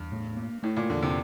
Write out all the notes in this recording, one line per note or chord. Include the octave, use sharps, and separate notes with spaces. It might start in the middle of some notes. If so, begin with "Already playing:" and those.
Already playing: E2 G2
A2
A#3
A2 A3
A#2
E2 D3
C3